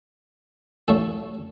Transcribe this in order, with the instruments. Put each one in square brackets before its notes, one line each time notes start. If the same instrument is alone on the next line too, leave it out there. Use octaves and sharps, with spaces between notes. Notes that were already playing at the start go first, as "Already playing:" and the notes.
[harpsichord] A1 A2 A3 A4 A5